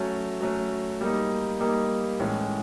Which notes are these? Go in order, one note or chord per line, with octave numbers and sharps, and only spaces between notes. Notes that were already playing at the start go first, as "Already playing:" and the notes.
Already playing: F#3 A3 C#4
F#3 A3 C#4
G3 A#3 D#4
G3 A#3 D#4
A2 E3 G#3 C#4